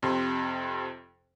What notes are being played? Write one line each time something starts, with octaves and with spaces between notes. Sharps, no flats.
F2 C3 C6